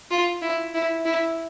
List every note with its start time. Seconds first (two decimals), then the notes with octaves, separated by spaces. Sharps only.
0.11 F4
0.42 E4
0.74 E4
1.05 E4